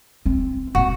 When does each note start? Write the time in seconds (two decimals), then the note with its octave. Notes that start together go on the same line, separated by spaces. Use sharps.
0.26 C4
0.75 A#2 A#3 F#4